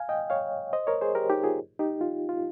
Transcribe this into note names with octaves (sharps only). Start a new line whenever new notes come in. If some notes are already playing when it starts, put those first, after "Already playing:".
Already playing: F5 G#5
D#5 G5
C#5 F5
C5 D#5
A#4 C#5
G#4 C5
G4 A#4
D#4 G4
F4 G#4
D#4 G4
F4
F4